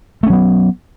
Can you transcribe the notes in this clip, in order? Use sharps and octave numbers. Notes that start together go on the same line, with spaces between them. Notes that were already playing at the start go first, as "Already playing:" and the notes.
F#3 A3 B3 C#4